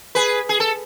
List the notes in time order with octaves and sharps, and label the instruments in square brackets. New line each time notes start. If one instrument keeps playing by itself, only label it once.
[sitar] G#4 B4
G#4
A4